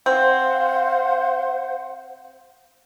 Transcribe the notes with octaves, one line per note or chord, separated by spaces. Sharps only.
C4 C5 F5 F#5